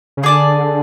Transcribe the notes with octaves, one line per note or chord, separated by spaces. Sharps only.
C#3
D3 G#4 D5 A5